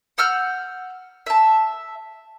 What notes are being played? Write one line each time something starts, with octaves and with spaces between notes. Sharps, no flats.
F#5 E6 F6 G6
E5 A5